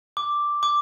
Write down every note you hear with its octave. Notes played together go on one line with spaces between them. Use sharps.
D6
D6